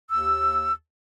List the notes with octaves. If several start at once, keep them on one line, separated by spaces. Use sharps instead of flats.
D#2 E6